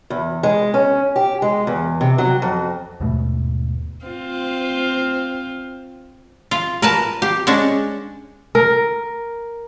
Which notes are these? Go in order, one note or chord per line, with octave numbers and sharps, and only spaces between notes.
E2
G#3
C#4
G4
G#3
E2
C3
F#3
F2
D#2 G#2 B2 A3
C4 F4
F4
A#4 B4 A5
G4
G#3 C#4 D4
A#4